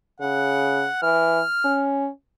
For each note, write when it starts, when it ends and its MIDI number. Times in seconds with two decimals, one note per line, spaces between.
0.21 0.85 49
0.21 1.00 78
1.03 1.40 52
1.03 1.84 89
1.64 2.09 61